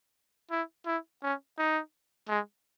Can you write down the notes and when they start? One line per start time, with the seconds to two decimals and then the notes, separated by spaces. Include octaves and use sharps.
0.51 E4
0.86 E4
1.23 C#4
1.58 D#4
2.29 G#3